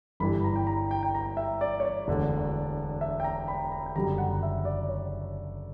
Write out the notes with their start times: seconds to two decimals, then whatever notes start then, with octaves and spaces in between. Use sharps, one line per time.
0.20 G1 G2 E3 G3 B5
0.44 A#5
0.56 G5
0.67 A#5
0.91 G5
1.03 G5
1.15 A#5
1.37 E5
1.61 D5
1.80 C#5
1.85 D5
2.08 E1 D2 D3
3.01 E5
3.20 G5
3.24 A#5
3.48 B5
3.72 A#5
3.86 G5
3.95 F#1 F#2 D3 G3 A#5
4.18 F#5
4.43 E5
4.65 D5
4.88 C#5